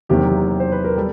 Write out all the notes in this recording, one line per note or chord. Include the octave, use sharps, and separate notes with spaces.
E2 C3 D#3 F#3 A#3 G4
C5
B4
A#4
G3 A4